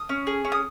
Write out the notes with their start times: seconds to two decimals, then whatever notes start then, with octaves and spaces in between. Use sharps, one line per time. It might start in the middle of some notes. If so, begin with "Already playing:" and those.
Already playing: D#6
0.09 C#4
0.27 G#4
0.45 C#4
0.52 D#6